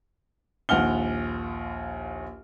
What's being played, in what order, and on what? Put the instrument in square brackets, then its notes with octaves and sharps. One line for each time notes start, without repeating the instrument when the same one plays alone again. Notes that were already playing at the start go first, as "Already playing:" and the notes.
[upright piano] A#1 D#2 F#5 F6 G7